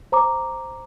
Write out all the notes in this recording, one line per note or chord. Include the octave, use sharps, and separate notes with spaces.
C5 A#5 D6